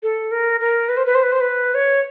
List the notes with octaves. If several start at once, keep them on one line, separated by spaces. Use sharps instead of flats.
A4
A#4
A#4
B4
C5
B4
C5
B4
C5
B4
C#5